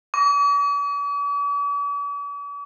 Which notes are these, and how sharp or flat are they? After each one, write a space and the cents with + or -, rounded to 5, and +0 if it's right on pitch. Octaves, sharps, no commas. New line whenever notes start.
D6 -45